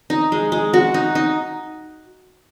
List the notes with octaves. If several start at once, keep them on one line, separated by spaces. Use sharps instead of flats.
D#4
G#3
G#3
F#4
D#4
D#4